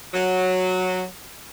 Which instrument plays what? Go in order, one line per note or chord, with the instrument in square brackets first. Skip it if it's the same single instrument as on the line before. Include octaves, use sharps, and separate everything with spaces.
[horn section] F#3